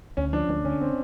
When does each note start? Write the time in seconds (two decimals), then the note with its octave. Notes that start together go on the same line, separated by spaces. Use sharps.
0.17 D2 C#4
0.33 F3 D4
0.48 D2 D4
0.65 D3 C#4
0.81 C4